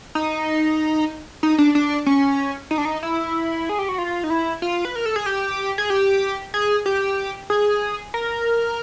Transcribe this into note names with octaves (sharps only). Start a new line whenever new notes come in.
D#4
D#4
D4
D4
C#4
D#4
D4
D#4
E4
G#4
G4
F#4
F4
D#4
E4
F4
B4
A#4
A4
G#4
G4
G#4
G4
G#4
G4
G#4
A#4